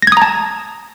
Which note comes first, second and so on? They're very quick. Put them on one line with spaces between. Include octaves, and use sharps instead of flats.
A#6 G#6 D#6 A#5 A5